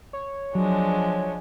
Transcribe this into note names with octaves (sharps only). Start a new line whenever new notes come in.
C#5
F3 F#3 G#3 D4